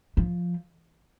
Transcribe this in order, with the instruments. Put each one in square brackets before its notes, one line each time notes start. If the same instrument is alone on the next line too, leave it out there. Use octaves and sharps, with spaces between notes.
[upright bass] F3